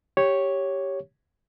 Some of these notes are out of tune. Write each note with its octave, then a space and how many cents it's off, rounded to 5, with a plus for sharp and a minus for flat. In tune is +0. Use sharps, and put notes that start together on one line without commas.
G4 +0 C#5 +0